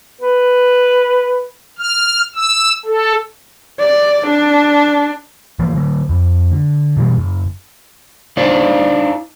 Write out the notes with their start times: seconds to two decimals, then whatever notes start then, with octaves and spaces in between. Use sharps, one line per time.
0.21 B4
1.78 F6
2.35 E6
2.85 A4
3.80 D5
4.26 D4
5.59 E3 F3 A#3
5.74 D3 F#3
6.09 F2
6.51 D3
6.97 B2 E3 G3
7.18 F#1
8.37 D4 D#4 C5 D5 F5